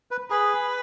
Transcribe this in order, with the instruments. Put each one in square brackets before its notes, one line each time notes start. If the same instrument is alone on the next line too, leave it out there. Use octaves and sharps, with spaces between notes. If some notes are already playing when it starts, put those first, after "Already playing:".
[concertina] B4
[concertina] G#4 [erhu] B4